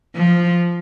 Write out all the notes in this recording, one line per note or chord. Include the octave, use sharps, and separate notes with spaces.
F3